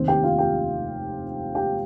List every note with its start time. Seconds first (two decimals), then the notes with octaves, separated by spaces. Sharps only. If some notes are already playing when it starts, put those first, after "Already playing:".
Already playing: F1 D#2 D#3 C4 C5
0.08 G4 G5
0.23 F4 F5
0.38 G4 G5
1.55 G4 G5